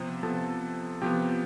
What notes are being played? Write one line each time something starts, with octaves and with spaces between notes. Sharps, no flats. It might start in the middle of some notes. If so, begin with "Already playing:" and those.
Already playing: C3 F3 B3 C5
C3 F3 B3 A4 A5
C3 F3 B3 G4 G5